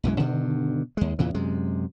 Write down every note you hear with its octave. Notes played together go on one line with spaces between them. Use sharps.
B1 F#2 E3 G#3
G2 B2 D3 D#3
D#2 G#3
E2 A#2 C#3 E3
F#2 C3 G#3